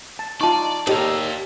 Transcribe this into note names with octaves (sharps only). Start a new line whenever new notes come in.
A5
D#4 F4 D5 A5 C#6
D#2 D#4 G4 A4 D5 F5